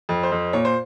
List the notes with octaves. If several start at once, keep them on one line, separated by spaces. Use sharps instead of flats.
F2
C5
F2
A#2 C#5
C5